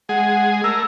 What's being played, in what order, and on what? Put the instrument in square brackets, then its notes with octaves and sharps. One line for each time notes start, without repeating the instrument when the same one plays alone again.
[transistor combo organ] G#3 G#4 [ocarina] F#5
[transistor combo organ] A3 A#4 [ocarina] E6